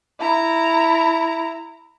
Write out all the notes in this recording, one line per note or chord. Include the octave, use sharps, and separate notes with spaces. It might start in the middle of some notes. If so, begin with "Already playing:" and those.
E4 A#5